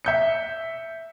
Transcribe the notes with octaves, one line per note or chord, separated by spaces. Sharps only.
E5 G6 C#7